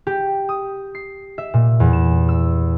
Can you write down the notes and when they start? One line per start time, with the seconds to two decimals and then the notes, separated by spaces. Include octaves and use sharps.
0.07 G4
0.49 D#6
0.95 C7
1.38 E5
1.54 A#2
1.80 E2
1.93 E7
2.29 E6